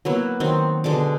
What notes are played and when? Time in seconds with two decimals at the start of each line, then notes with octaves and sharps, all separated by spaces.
0.05 F#3 A#3 B3 E4
0.40 D#3 F#3 C4
0.84 B2 D3 G#3 D6